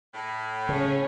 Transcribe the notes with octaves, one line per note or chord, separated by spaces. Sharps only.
A2
C#3 C#4